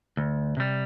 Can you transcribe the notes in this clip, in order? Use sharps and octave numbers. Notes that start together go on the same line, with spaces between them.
D2
C3 G3